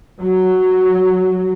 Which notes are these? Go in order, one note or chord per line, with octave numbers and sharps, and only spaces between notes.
F#3